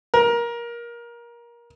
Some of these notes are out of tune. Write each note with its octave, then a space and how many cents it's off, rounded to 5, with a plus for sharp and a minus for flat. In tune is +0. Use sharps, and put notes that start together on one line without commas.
A#4 +20